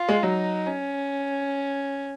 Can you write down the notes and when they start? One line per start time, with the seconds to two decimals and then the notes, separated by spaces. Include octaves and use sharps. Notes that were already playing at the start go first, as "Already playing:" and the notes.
Already playing: F4
0.09 G#3
0.23 F#3 D#4
0.67 C#4